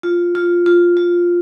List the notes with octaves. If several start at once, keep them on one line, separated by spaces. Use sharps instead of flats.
F4
F4
F4
F4